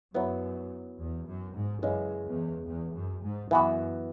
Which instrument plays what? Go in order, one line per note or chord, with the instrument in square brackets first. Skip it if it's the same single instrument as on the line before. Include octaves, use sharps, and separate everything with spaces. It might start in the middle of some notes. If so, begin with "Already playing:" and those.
[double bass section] F#2 [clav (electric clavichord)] F#3 B3 E4
[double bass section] E2
F#2
G#2
[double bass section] F#2 [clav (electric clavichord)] C#3 E3 G#3 C#4 E4
[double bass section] E2
E2
F#2
G#2
[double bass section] F#2 [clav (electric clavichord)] E3 B3 F#4